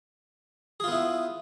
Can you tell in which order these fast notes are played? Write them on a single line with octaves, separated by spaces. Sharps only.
G#4 F4 B3 E4